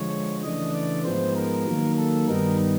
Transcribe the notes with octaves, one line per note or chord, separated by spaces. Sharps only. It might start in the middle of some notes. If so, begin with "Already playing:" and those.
Already playing: D3 F3 G#3 C#5
C#3 E3 A3 D4 D#5
D5
G#2 F3 G#3 B3 C5
A#4
D#3 F#3 A#3
A4
G2 D#3 G3 B3 D#4 A#4